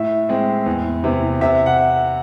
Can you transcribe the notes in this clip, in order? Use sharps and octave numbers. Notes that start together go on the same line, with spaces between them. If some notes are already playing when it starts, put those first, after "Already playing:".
Already playing: A2 E5
G#3 C4
E2
C3 E3
C3 E5
F#5